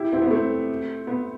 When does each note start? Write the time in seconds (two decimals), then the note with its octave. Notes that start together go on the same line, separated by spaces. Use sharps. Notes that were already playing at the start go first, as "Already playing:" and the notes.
Already playing: E4 G4
0.12 C4 E4
0.22 B3
0.31 A3 C4
1.07 B3